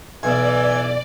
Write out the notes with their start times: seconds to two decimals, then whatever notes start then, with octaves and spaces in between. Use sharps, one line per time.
0.23 B1 E3 D5 G#5